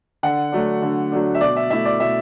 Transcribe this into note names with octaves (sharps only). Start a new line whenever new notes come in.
D3 F#5
F#3 A3 D4
D3
F#3 A3 D4
E5
B2 D5
E5
A3 E4 E5
D5
B2 E5